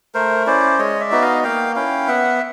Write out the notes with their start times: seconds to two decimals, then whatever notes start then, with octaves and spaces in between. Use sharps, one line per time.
0.14 A3 A#4 C5
0.46 C#4 E4 C5 D5
0.78 G#3 C#5 D#5
1.00 D5 E5
1.11 B3 D#4 F#4
1.22 D#5 F5
1.44 A#3 F5 G5
1.76 C#4 E4 F5 G5
2.08 B3 E5 F#5